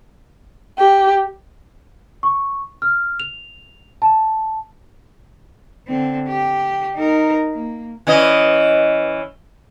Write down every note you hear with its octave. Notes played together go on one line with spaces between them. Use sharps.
G4
C#6
F6
F7
A5
D3 C4
G4
D#4 A#4
A#3
E3 C#4 D#5